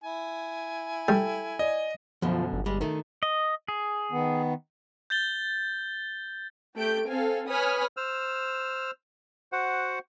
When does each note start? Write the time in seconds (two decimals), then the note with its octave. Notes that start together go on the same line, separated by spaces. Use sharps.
0.04 E4 G#5
1.08 G3 A4 G5
1.59 D5 D#5
2.22 F#2 B2 D3 F3
2.53 G1
2.66 G3 G#3
2.81 D#3 A3
3.23 D#5
3.68 G#4
4.12 D#3 B3
5.10 G6 A6 G7
6.76 A3 G4 A4 G6 D7
7.08 C4 A4 F5 G#5
7.49 B4 C#5 G#5 B5 D#6 F6
7.97 C5 E6 F6
9.52 F#4 C5 F#5